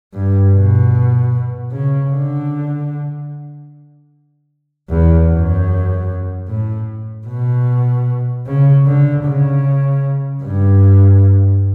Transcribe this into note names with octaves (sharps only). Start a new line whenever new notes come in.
G2
B2
C#3
D3
E2
F#2
A2
B2
C#3
D3
C#3
G2